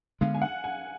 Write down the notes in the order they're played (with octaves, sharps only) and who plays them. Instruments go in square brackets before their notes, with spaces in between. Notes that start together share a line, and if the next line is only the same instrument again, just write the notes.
[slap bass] D3 G#3 B3 D4 [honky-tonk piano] F5
[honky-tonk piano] G#5
F#5
G#5